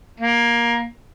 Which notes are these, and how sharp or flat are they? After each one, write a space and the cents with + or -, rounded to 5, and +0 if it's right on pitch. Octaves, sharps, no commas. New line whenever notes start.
A#3 +15